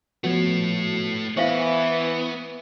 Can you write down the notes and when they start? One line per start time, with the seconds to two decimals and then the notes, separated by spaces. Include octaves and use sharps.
0.24 F3 A3 B3 F#4 C#5
1.37 E3 B3 E4 C5 E5 F5 C#6